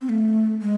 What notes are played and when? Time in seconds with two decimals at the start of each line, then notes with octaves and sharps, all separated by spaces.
0.01 C4
0.10 A3
0.62 G#3